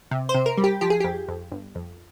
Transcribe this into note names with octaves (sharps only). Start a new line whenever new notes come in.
C3
C5
C3
A#4
G3
G4
F3 G4
G#4
F2 G4
F2
G1
F2